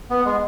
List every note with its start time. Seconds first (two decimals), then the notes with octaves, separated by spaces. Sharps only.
0.10 B3
0.25 G#3